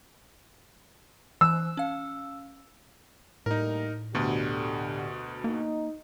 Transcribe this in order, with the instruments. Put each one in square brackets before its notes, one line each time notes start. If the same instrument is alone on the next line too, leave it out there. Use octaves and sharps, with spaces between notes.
[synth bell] E3 F#6 [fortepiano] E6
[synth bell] C#4 F5
[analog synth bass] A2 [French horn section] G3 A3 A#3 [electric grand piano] D#4 A#4
[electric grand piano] D2 B2 [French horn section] D3 G4
[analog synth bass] A#3 [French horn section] D#4